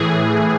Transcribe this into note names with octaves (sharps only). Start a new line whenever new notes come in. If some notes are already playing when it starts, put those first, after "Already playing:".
Already playing: A2 E3 G#4